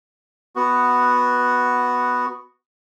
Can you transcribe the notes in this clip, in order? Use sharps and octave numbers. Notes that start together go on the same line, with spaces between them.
B3 F#4